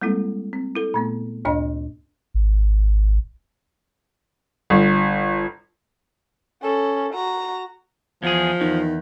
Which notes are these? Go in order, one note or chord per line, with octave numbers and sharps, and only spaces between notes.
G3 G#3 A#3 C4 E4 A4
C4
E4 A4
A#2 A3 B3
D2 G2 A#2 D4 C#5 D#5
G#1
G1
C#4 A4
F#4 A#5
E2 F3 G#4
E2 D#3